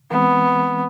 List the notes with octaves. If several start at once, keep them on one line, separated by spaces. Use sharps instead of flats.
E3 G#3 B3 C4